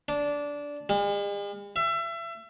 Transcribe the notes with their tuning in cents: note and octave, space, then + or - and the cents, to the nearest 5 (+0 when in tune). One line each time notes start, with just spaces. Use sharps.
D4 -15
G#3 -45
E5 +30